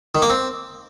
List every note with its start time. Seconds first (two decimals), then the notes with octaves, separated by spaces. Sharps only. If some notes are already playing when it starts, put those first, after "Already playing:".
0.15 D#3
0.22 A#3
0.30 C4